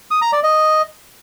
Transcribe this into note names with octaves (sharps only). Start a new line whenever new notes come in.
D#6
A#5
D5
D#5